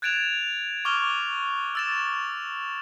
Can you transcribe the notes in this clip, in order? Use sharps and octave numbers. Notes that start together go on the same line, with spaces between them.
F#6 G#6 A6 D7 E7 F7
C#6 D6 F6 F7 G7
E6 A6 E7